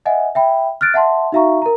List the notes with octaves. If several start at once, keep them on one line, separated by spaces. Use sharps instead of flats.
D#5 E5 F#5 G#5
E5 G5 B5
F6 F#6 A6 D7
E5 F#5 A5 C6
D#4 F#4 E5 F5 A#5 C#6
A#4 A#5